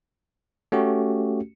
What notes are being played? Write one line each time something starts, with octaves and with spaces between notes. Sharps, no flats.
A3 C#4 F#4 G4